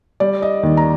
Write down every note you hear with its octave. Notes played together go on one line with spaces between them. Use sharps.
G3 D5
D#5
D#2
A#5